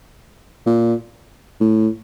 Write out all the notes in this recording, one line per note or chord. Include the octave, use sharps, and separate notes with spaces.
A#2
A2